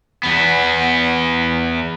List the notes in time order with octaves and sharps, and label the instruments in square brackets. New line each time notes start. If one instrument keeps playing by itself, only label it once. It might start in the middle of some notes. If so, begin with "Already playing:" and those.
[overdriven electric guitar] E2 B3